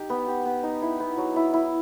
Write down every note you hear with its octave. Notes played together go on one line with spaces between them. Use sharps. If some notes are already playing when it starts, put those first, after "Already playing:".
Already playing: D#4 G4
B3
G4
B3
D#4
E4
B3
F#3
E4
E4